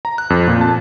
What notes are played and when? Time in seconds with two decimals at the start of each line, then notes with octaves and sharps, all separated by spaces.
0.05 A#5
0.18 F#6
0.30 F2
0.48 A#2
0.61 A5